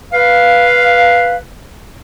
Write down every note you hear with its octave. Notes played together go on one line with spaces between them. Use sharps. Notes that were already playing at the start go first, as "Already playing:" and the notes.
B4 F5